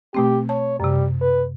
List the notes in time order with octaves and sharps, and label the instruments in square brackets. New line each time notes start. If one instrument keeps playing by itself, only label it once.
[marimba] B2 A3 C4 [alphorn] G4
[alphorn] C#5 [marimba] A5
[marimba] F#2 C3 [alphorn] G3
[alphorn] B4